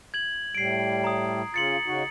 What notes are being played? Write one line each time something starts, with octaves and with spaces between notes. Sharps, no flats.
G#6 F#7
A2 G3 C7 D7
A#5 D#6
C#3 F4 A6 C#7 F#7
C#3 D#4 F#4